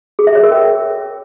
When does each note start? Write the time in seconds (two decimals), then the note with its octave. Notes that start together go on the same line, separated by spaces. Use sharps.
0.19 G#4
0.27 E5
0.35 C#5
0.43 A#4
0.52 G5